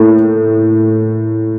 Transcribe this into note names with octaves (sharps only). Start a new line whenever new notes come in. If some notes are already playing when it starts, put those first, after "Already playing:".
Already playing: A2 A#3